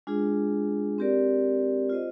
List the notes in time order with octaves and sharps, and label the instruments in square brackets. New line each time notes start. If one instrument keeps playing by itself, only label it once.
[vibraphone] G#3 D4 F4 G#4
C4 G4 A#4 D5
F4 C5 D#5